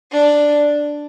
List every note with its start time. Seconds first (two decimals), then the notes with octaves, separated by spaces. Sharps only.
0.11 D4